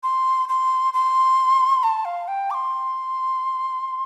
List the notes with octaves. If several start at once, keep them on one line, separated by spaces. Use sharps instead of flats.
C6
C6
C6
A5
F5
G5
D6
C6